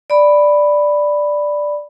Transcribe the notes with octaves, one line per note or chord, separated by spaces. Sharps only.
D5 B5